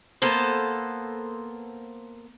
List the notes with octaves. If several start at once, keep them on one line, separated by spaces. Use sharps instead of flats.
A#3 B3 A4 C5